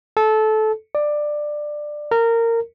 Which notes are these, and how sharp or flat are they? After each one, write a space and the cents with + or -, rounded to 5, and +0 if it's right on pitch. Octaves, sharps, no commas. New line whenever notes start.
A4 -20
D5 +15
A#4 -20